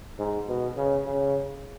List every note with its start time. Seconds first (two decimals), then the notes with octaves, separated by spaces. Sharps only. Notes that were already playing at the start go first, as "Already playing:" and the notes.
0.19 G#2
0.48 B2
0.77 C#3
1.05 C#3